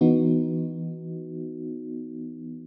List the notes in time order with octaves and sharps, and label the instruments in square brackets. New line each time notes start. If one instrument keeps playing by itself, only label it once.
[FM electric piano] E3 B3 D#4 F#4